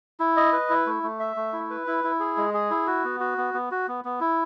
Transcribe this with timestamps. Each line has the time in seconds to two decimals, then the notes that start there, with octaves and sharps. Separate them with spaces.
0.20 E4
0.37 D#5
0.52 B4
0.70 E4
0.86 A3
1.03 A3
1.20 E5
1.36 A3
1.53 E4
1.70 B4
1.87 E4
2.04 E4
2.20 G#4
2.37 G#3
2.54 G#4
2.70 E4
2.87 F#4
3.04 B3
3.20 F#4
3.38 B3
3.54 B3
3.71 F#4
3.88 B3
4.05 B3
4.21 E4